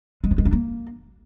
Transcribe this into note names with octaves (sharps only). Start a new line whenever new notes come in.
G#3
F3
G#3
D4
A#3